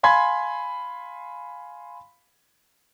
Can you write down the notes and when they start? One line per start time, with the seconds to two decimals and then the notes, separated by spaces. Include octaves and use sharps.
0.03 F5 G#5 B5 C6 G#6